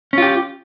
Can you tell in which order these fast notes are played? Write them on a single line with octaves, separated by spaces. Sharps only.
C#4 F4 G4